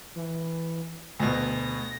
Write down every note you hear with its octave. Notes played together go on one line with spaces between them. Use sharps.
E3
D2 B2 A#6